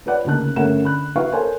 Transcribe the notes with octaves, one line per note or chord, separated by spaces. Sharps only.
F4 B4 C#5 D5 F#5
D2 C#3 A#3 D#4 A5 F#6
G1 A3 C#4 A#4 F#5 E7
D3 B5 F#6
E4 F#4 B4 F5 F#5 C#6
A4 A#4 C5 C#5 G#5 A5